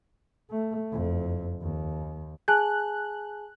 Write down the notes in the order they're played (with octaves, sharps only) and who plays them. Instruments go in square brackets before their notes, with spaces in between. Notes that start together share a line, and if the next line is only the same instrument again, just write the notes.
[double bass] A3
F#1 F2
D#2
[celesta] G#4 G#5 A5 [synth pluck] F#6